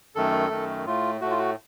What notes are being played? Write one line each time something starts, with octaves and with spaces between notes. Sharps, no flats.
F#2 D#3 A3 A4
F#2 D#3 A3
A2 A3 F4
A2 A3 F#4
F4
F#4